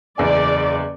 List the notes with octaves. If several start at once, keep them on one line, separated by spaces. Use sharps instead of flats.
F#1 E2 D5 G#5